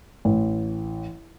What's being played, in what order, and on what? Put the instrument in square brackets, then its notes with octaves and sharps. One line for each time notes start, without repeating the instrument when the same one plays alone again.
[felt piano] A1